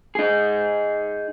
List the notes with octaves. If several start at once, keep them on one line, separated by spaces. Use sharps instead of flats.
D#4 G#4